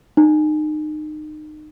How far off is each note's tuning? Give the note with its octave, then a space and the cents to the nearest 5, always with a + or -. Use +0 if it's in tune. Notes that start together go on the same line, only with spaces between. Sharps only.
D#4 -30